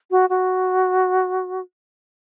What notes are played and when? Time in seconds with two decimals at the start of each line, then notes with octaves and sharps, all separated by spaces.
0.11 F#4
0.29 F#4